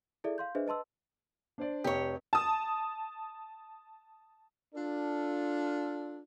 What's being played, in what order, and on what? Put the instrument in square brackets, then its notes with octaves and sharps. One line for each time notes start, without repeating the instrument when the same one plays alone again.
[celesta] E4 G#4 A4 D5 E5
F5 C6 G6
D4 G#4 B4 C5 D#5 E5
B4 D#5 A5 C6 E6
[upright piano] D4 C5 D5
[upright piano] F1 [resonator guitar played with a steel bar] G4 C#5
[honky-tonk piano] A5 D#6
[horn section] D4 F4 A4